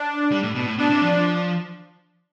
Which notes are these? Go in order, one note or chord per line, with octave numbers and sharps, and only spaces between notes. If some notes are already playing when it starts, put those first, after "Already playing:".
Already playing: D4
G3
A2
B2
A2
B2 D4
C3
F3
F3